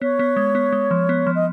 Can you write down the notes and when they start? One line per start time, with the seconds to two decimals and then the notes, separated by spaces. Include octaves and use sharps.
0.02 B3 C#5
0.19 B3
0.36 G#3
0.55 B3
0.72 G#3
0.91 F3
1.09 B3
1.27 F3
1.35 D#5